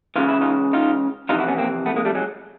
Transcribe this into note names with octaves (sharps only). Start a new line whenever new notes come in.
C#2 C#3 E3 F4
E4
D#4 F4
D#4 F4
F2 C3 E3 D#4 F4
E4 F#4
B3 C#4
A#3 C4
A3 B3
G#3 A#3
G3 A3
F#3 G#3